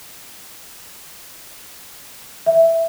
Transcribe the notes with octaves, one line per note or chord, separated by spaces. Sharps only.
E5